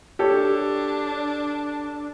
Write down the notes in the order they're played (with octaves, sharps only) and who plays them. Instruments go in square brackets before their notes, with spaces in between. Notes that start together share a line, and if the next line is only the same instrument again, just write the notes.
[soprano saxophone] D4 [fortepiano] G4 A4 C#5